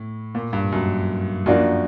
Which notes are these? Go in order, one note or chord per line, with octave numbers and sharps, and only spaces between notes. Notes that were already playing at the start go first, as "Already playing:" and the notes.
Already playing: A2
A#2
G2
F#2
F#2 F3 A#3 D4 F#4